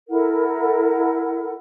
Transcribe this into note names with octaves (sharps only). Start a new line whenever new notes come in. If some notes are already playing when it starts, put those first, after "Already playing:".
E4 A4 A#4 F#5